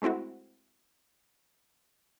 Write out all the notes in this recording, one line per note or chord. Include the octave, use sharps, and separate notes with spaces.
G#3 A3 C4 E4 F#4